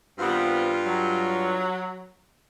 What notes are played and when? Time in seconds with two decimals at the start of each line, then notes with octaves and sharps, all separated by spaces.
0.18 G2 D#3 G3 B3 C4 F4
0.86 F#3